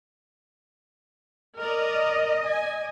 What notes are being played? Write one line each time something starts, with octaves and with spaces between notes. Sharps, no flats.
A#4 D5 D#5
G#5